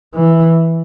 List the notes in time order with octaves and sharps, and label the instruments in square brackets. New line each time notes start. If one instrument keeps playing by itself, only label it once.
[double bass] E3